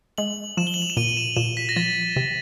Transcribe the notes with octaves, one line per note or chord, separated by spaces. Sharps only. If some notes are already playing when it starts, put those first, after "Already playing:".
G#3 F#7
F3 E7
G7
F#7
F7
E7
A#2 D#7
E7
A#2 E7
B6
A#6
F3 A6
C3